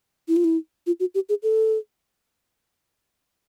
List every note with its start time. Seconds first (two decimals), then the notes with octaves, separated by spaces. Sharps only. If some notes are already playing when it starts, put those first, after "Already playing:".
0.28 E4
0.36 F4
0.44 E4
0.87 F4
1.00 F#4
1.15 G4
1.29 G#4
1.43 A4